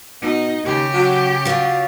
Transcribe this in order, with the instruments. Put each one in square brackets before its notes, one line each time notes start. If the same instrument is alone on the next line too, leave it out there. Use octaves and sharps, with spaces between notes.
[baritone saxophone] B2 [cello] D#4
[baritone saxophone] D#2 [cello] C#3 G4
[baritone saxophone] F#3
[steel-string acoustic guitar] F#3 F4 [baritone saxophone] F#4